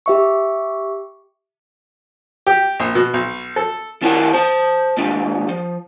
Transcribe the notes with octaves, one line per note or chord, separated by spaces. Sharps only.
G4 E5 C#6
G4
A#1
B2
B1
A4
D#3 C4 E4 A#4 F#5 A5
C5 A5
D#2 G#2 C3 D4
F3